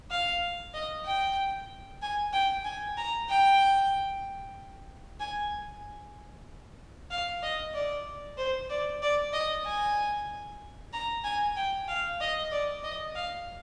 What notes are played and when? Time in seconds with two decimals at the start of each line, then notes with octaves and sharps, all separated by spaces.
0.11 F5
0.74 D#5
1.05 G5
2.02 G#5
2.33 G5
2.65 G#5
2.97 A#5
3.29 G5
5.20 G#5
7.11 F5
7.43 D#5
7.75 D5
8.38 C5
8.70 D5
9.02 D5
9.33 D#5
9.66 G#5
10.93 A#5
11.24 G#5
11.56 G5
11.88 F5
12.21 D#5
12.52 D5
12.84 D#5
13.15 F5